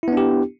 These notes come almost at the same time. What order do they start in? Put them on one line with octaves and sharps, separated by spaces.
E4 B3 D4 G4